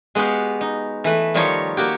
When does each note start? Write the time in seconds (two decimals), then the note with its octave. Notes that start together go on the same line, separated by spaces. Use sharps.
0.15 G#3 B3 F#4 G4 F5
0.61 D#4
1.04 E3 A3 B4
1.34 D#3 F3 G3 D#4 F4 C#5
1.77 A#3 F#4 G4